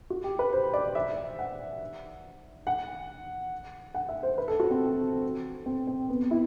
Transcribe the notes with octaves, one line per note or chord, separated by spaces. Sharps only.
F#4
G4
B4
C5
D5
E5
F#5
F#5
F#5
E5
C5
B4
A4
F#4
C4
C4
C4
B3
E4